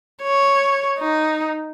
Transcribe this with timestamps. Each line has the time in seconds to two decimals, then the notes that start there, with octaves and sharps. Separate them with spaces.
0.22 C#5
0.99 D#4